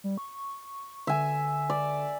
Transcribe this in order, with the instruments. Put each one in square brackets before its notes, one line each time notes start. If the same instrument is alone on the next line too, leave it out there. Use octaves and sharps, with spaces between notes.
[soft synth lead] G3
C#6
[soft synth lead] D3 [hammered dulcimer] E5 G#5
[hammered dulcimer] D5